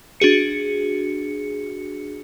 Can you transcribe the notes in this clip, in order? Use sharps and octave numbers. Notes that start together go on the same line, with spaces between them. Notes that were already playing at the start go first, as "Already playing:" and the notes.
D4 F#4 G#4 C#7